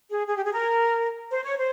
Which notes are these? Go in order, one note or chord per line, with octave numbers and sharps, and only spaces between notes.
G#4
G#4
G4
G#4
A#4
C5
C#5
C5